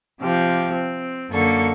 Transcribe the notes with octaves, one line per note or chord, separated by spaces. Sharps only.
C3 F3 G4
C4
F#2 D3 A#3 A4 C#6